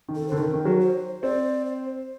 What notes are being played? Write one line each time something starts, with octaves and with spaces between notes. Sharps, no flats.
D#3
A4
D3 C5
D#3 A#4
D#3
F#3
C5
C4 D5
C5